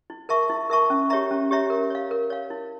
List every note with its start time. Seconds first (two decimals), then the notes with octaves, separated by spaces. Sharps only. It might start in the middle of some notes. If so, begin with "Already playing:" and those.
0.10 E4
0.29 A#4 E5 A5 C#6
0.50 E4
0.70 A#4 E5 A5 C#6
0.90 C#4
1.10 G4 C#5 E5 A#5
1.31 C#4
1.51 G4 C#5 E5 A#5
1.70 A#4
1.90 C#5 F5
2.11 A#4
2.30 C#5 F5
2.50 E4